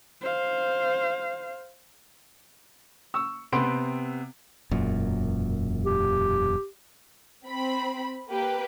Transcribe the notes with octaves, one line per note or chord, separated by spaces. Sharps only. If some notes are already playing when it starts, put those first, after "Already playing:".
C5 F5
C#6 E6
C3 B3 C4 B4 C6 D7
E1 F#2 A#2
G4
C4 B5
A#3 G4 B4